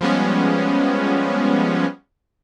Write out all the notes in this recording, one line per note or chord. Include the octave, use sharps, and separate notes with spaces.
F3 G3 G#3 B3 C#4